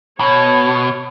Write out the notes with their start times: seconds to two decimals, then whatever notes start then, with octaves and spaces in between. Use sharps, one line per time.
0.20 B2 C#5